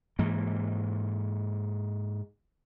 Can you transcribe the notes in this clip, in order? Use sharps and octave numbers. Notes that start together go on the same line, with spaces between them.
G#2 E3 A#3